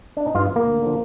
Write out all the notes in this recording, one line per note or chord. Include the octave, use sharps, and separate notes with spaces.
D4
D#4
G2 F4
F3
A#3
D2
D3 F3